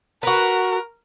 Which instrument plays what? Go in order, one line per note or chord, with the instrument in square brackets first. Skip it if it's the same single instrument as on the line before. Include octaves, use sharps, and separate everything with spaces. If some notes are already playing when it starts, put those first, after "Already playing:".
[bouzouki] F#4 B4 [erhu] A#4